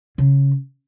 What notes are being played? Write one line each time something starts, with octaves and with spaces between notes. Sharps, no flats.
C#3